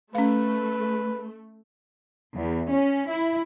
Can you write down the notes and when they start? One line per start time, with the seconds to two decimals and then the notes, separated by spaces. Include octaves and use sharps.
0.15 A3 C#4 B4 F5
2.34 E2
2.69 C#4
3.09 E4